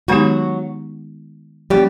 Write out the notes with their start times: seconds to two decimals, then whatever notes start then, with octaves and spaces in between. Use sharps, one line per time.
0.08 D#3 F#3 G#3 B3 D#4 F#4 G4
1.70 F3 G3 A#3 C#4 G4